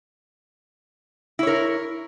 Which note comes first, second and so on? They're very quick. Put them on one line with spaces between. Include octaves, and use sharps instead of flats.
E4 C#5 A#4